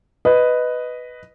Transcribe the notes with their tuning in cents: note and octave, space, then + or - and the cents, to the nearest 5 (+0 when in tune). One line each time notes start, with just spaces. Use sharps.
B4 +5 D#5 +0